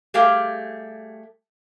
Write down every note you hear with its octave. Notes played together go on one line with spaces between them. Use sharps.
G3 A3 G4 G#4 F5 G5